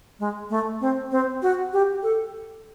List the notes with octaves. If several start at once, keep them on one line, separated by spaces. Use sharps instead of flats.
G#3
A3
C4
C4
F#4
G4
A4